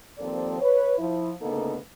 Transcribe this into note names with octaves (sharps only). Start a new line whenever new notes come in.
D#2 F3 A#3 C4 A4 D5
B4 C#5
F3 E4
D2 C#3 A#3 B3 D#4 A4